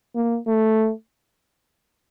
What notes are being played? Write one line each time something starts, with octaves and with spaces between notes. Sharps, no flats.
A#3
A3